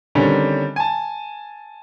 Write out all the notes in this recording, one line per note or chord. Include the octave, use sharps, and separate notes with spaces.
D3 D#3 G3 C4 C#4
G#5 A5